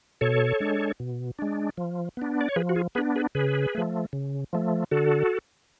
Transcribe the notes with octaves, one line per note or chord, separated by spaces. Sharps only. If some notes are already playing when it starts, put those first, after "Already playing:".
B2 A4 C#5
G#3 D4
B2
G#3 D4
F3
B3 D4
D5
C#5
F3 G#4 B4
F#4
F4 G#4
B3 D4 G#4 B4
G#4 B4
C#3 G#4 B4
F3 A3
C#3
F3 A3
D3 F#4 A4